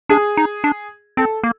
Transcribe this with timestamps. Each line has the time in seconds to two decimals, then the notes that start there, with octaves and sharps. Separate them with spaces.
0.09 D4 G#4
0.37 D#4
0.64 D4
1.17 C4 A4
1.43 A#3